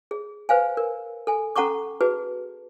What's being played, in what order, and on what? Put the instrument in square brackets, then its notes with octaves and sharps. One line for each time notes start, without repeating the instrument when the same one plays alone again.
[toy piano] G#4
B4 C5 F5 G#5
A#4
A4 G#5
C#4 A4 F#5 A#5 C#6 D6
F#4 G#4 B4 A5